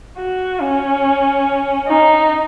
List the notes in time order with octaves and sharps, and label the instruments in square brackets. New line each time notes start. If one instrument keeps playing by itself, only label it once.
[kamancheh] F#4
C#4
D#4